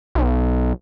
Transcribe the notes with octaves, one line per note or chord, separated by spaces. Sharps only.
B1